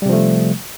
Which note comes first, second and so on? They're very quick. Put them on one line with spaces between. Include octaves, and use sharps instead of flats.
G3 C3 F3 A3